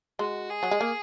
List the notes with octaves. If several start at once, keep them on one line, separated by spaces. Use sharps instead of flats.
G#3 F#4
G#4
F#3
G#3
A#3